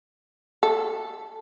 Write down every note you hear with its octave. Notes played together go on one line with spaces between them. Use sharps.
A4